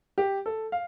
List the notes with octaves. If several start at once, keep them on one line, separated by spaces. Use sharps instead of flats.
G4
A4
F5